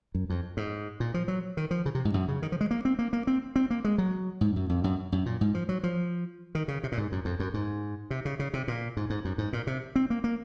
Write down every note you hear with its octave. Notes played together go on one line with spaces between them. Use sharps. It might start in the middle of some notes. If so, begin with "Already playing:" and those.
F#2
F2
G#2
A#2
F3
F#3
D#3
F3
C#3
C3
G#2
F#2
C#3
D#3
F3
G#3
A#3
C4
A#3
A#3
C4
C4
A#3
G#3
F#3
G#2
F#2
F2
F#2
F#2
A#2
G#2
F3
F#3
F3
D#3
C#3
C3
A#2
G#2
F#2
F2
F#2
G#2
C3
C#3
C#3
C3
A#2
G#2
G#2
F#2
G#2
A#2
C3
C4
A#3
A#3